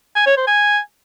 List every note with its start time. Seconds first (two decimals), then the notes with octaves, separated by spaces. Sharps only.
0.16 G#5
0.27 C#5
0.37 C5
0.48 G#5